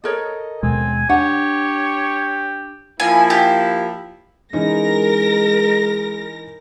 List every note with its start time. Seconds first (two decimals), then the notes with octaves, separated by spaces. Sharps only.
0.04 A4 A#4 C#5 D#5
0.63 D#2 B2 G#3 C4 G#5
1.09 D4 G4 C#5 F#5
3.00 F3 A#3 E4 G#5
3.30 G4
4.53 E3 G#3 C#4 D#4 A#4 A#6